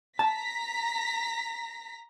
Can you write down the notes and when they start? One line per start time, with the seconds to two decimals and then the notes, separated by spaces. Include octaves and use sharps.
0.19 A5 A#5 A#6 B6